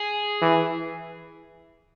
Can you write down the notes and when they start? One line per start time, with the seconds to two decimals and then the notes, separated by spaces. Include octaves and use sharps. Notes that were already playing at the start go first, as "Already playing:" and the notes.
Already playing: G#4
0.42 E3